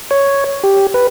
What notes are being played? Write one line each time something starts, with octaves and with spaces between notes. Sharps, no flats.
C#5
G4
B4